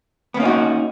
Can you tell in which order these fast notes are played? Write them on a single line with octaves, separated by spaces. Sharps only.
B3 A#3 C#4 D#4 F#4